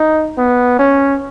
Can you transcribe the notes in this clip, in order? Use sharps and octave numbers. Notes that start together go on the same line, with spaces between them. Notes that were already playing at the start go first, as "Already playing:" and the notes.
Already playing: D#4
B3
C#4